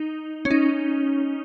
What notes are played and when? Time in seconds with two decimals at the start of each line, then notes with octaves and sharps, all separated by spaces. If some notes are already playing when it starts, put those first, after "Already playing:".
Already playing: D#4
0.45 C#4
0.51 D#4